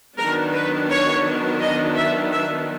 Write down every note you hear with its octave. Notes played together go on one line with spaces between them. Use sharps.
D#3 F#3 B3 D4 A#4
B4
C#5
D#5
E5
E5